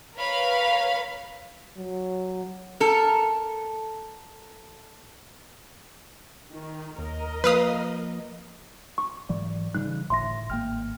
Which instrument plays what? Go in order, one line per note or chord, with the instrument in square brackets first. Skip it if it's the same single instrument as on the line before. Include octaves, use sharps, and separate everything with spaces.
[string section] A#4 B4 C#5 F5 B5
[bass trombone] F#3
[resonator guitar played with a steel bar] A4 A#4
[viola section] D#3
[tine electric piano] D#2 [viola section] A#4 D#5
[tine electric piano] F3 A#3 [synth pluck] B4 F5 D#6
[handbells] C#6
[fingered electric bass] G#2 E3 F#3 [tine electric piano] D5
[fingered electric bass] C#3 E3 G3 [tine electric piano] D#4 [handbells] F#6
[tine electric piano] G1 E5 A#6 [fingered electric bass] A2 [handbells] C6
[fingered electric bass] G#1 A#3 [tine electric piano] G5 F6